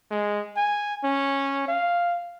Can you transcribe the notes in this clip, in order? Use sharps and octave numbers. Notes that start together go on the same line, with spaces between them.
G#3
G#5
C#4
F5